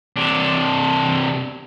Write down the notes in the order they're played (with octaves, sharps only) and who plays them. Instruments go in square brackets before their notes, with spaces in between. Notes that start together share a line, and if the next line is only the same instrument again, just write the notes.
[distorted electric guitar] C3 D4